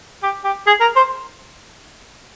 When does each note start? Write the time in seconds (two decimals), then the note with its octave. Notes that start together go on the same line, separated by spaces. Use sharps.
0.23 G4
0.45 G4
0.67 G#4
0.80 A#4
0.96 C5